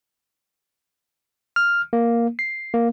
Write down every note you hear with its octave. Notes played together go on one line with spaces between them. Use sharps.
F6
A#3
C7
A#3